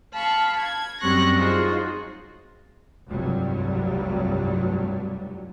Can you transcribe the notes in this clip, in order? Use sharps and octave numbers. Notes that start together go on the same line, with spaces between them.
F5 A5 B5 C#6
G#6
F#2 G3 C4 C#6 F#6 A#6
D#4 F4 F#4 G#4 C5
F1 C2 G2 F#3 G3